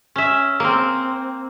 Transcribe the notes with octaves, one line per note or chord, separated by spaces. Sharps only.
C#4 E5
A#3 C4